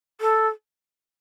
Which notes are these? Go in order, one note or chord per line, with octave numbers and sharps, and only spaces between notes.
A4